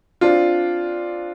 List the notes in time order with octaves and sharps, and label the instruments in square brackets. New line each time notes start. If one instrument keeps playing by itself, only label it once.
[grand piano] C4 D4 F4